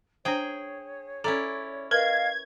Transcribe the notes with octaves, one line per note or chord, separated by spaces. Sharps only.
D4 G#4 C5 C#5 G5
C#4 E4 A4 D5 A#5
A#4 B4 D#5 F5 G#6